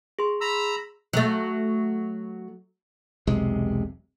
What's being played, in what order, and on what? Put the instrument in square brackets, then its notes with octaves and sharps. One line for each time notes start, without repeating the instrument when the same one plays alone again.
[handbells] G#4 C6
[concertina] A#5 B5 E6
[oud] F#3 A3
[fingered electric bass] E1 B1 C3 G#3